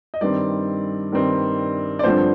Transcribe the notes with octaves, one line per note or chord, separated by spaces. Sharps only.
D#5
G2 D#3 G3 C4 D5
G2 D#3 G3 C4
D5
G2 D3 F3 C4 C5